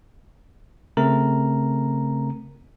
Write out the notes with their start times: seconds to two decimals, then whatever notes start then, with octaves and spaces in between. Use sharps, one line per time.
0.97 C#3 A3 C4 A#4 A#5